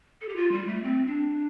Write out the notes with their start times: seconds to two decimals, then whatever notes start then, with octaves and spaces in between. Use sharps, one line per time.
0.21 A4
0.29 G4
0.36 F4
0.52 G3
0.67 A3
0.83 C4
1.07 D4